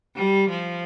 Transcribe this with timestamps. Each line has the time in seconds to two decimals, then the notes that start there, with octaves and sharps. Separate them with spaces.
0.16 G3
0.49 F3